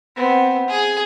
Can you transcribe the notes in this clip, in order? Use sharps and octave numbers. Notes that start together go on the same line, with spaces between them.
B3 C4
G#4